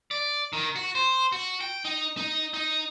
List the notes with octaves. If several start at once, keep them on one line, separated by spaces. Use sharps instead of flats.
D5
D#3
F#4
C5
F#4
G5
D#4
D#4
D#4